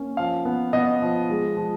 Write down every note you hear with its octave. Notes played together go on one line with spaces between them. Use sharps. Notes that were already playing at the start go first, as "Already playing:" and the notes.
Already playing: A#3 C#4
F3 F5
B3
B3 D#5
F3
G#3
F3